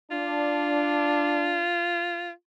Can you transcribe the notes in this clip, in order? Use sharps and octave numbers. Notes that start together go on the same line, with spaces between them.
D4 F4